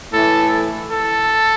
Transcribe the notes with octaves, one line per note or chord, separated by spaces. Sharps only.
A2 E3 A4
A4